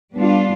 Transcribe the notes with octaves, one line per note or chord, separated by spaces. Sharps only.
G3 B3 D4 F4